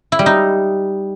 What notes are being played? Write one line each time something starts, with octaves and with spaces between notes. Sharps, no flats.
E4
G3
D#4